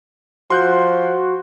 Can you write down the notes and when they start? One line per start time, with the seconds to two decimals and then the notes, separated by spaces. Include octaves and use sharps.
0.50 F3 F#4 C6 F#6 G6